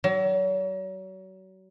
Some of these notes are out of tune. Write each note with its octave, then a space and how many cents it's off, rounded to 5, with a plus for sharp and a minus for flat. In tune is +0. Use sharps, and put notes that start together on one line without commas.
F#3 +35